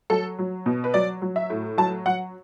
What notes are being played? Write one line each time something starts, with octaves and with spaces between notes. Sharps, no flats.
F#3 A4
F#3
B2
B4
F#3 D5
F#3
E5
A2
F#3 A5
F#3 F#5